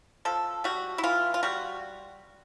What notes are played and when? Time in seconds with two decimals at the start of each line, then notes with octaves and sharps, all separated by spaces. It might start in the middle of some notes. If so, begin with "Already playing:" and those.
0.25 F3 A4
0.64 G3 F#4
0.98 E4
1.03 E3 F4
1.34 F4
1.43 G3 F#4